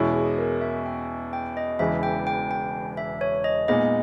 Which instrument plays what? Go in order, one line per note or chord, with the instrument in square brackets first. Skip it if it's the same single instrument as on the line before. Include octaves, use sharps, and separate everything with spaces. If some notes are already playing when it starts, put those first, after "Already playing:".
Already playing: [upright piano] E2 B2 G#3 C#4 E4
[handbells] G#4
A#4
E5
G5
G5
D#5
[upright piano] E1 E2 C#3 E3 [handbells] E5
[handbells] G5
G5
G5
E5
C#5
D#5
[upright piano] A#2 G#3 B3 D#4 [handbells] D#5